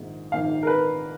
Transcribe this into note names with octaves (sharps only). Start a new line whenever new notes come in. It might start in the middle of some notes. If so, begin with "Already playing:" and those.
Already playing: A#1 G#2 D#3
A#1 G#2 D#3 F5
A#4
B4